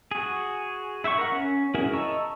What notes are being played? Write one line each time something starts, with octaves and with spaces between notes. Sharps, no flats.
F#4 G#4
E4 E5 F#5 C#6
A#4 F#5
C#4
C#4 E4 F#4 G#4 A#4
D#5 A5 A#5 C#6 E6